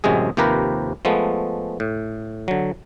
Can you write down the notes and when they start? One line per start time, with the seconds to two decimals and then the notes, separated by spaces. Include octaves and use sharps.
0.04 A1 F#2 C3 G#3 G#4
0.37 D#2 C3 F3 G4 A#4 B4
1.05 F3 G#3 A3 B3
1.80 A2
2.48 D3 F#3